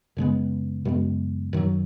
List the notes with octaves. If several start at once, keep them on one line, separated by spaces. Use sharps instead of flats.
F#2 C#3 G#3 B3
F#2 C#3 G#3 B3
F#2 D#3 F#3